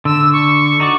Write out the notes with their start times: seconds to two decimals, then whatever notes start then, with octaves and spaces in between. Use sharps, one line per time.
0.05 D3 E6
0.33 C#6
0.80 D#4 F#4 D5